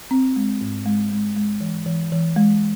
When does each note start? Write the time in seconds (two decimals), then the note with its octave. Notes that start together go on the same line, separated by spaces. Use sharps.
0.11 C4
0.36 G#3
0.61 G#2
0.86 G#3
1.12 G#3
1.36 G#3
1.61 E3
1.86 E3
2.12 E3
2.36 G#3